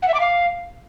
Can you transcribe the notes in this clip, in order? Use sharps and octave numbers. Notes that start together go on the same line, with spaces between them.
F#5
E5
D6
F5